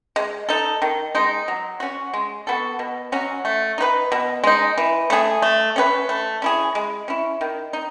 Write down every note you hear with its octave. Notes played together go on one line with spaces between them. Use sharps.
G#3
D#4 A4
D#3
G#3 D#4
F#3
C#4 F#4
G#3
B3 F#4 A4
B2
F#3 C#4 F#4
A3
D#4 F#4 B4
B2
G#3 D#4
E3
A3 D#4 G#4
A3
C#4 G#4 B4
A3
C#4 E4 G#4
G#3
C#4 E4
D#3
D#4